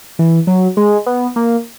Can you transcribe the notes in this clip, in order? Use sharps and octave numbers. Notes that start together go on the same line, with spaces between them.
E3
F#3
G#3
B3
A#3